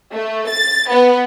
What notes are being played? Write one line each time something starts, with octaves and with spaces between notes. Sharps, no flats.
A3
A6
B3